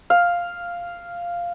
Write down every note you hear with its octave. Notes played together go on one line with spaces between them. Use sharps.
F5